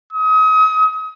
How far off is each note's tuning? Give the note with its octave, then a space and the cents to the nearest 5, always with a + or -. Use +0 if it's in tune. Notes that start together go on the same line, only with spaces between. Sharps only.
D#6 +35